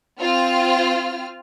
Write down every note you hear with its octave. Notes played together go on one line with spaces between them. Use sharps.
C4 F4 F6